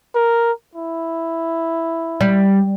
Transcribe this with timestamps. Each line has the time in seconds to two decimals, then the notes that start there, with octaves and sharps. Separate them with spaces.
0.15 A#4
0.75 E4
2.21 G3